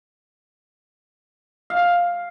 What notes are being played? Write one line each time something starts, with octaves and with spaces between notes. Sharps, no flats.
F5